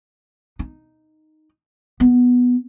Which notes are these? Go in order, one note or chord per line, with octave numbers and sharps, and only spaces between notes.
D#4
B3